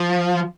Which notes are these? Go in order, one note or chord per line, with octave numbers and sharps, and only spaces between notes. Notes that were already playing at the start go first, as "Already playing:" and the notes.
Already playing: F3